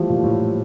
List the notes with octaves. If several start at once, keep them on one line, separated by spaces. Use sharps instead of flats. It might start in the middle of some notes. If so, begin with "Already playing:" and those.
Already playing: E3 F3 G3 A3
A#2
A2